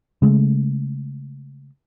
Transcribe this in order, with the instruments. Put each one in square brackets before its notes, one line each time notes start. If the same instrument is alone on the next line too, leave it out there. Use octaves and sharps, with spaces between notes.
[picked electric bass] C#3 G#3 A3